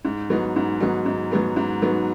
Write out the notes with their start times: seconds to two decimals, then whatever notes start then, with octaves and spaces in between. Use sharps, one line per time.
0.04 G#2
0.30 F#3 B3 D#4
0.56 G#2
0.80 F#3 B3 D#4
1.06 G#2
1.31 F#3 B3 D#4
1.56 G#2
1.82 F#3 B3 D#4